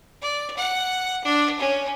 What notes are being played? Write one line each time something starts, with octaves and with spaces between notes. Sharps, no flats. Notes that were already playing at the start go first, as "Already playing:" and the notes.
D5
F#5
D4
C#4